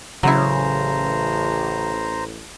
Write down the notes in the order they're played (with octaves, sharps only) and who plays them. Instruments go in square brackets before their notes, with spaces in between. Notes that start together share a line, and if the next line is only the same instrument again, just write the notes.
[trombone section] A1 [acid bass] C#3 [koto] F#3 E4 [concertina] C5 A#5